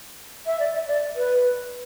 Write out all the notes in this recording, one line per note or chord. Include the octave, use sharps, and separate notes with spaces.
E5
D5
E5
D5
B4